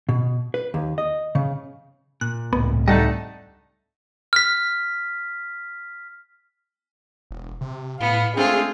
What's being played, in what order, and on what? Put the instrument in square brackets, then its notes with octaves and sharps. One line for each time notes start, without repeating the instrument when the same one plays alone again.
[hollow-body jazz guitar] B2
B4
D#2
D#5
C#3
[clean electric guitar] A#2 [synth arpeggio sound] F#6
[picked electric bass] C#2 A2 C4 [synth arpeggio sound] B3
[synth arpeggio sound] G3 [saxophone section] A3 D4 D#4 [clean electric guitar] D#5 F#5 A5
[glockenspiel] F6 B6
[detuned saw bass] E1
C3
[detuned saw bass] A2 [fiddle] B3 [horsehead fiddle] F5
[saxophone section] G#3 A3 C4 [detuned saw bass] D4 [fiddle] F4 [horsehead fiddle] G#4